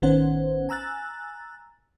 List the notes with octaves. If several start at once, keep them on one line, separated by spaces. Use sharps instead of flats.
A1 D#3 B3 C#4 C5 F#5
G#5 A#5 E6 F#6 A6